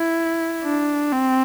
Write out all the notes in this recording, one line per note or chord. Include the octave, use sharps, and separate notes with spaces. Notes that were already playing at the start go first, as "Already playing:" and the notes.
Already playing: E4
D4
C4